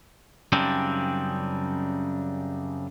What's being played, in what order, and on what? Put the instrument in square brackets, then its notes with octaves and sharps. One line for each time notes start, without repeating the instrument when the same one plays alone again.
[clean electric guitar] F#2 C#3 G3 C4 D4 D#4